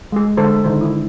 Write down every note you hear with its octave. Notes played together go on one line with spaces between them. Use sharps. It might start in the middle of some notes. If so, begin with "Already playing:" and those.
G#3 G#4
D3 G#3 A4 C5
D3 D#3 C5
D3 E4